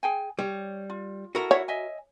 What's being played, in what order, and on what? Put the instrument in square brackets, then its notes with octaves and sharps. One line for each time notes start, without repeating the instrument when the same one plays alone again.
[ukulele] G#4 G5 G#5
[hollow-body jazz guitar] G3 [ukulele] C#5
[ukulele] F4
[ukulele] E4 A4 [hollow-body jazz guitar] F#4 A#4
[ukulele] E4 E5 F#5 [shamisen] C#5
[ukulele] D#5 E5 G#5